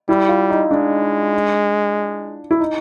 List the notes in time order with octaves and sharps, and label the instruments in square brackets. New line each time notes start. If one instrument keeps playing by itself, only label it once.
[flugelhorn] G3 [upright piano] E4
[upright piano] F4
D#4
[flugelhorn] G#3 [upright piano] D4
[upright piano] E4
D#4